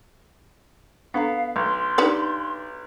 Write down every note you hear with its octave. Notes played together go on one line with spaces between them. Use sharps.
B3 D4 A4 F5 A#5
B1 C6
D4 D#4 G4 B4 D5